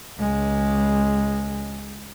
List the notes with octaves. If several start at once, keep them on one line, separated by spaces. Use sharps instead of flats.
C#2 G#3